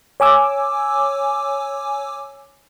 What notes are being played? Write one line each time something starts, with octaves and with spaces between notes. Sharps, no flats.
C#5 G#5 D6 E6